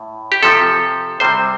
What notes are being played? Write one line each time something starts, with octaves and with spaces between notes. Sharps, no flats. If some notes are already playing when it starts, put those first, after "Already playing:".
Already playing: A2
G4
C3 F3 C4 A4
C3 G3 C4 C5